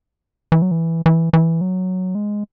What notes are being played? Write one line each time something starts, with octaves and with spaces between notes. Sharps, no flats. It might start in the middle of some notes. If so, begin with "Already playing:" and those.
E3
F#3
E3
E3
E3
F#3
G#3